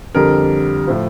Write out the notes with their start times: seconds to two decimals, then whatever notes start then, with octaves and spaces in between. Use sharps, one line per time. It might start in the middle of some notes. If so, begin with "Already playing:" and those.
0.15 F2 D3 G3 A#4
0.87 A2 F3